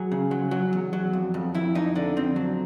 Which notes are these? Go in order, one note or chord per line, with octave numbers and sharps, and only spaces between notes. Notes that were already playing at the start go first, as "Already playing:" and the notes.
Already playing: F#3 G#4
C#3
F#3
F#3
E2
F#3
F2
F2
F2 E4
F2 D#4
D3 D4
F2 C4
F#3